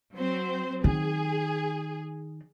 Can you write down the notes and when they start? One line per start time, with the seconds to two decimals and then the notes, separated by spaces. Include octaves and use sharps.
0.17 F#3 C4 C5
0.84 D#3 G#4